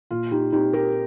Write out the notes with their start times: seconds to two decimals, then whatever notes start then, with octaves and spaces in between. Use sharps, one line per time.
0.11 A#2 F4
0.31 D#4 G4
0.52 C4 D#4 G4
0.73 G4 A#4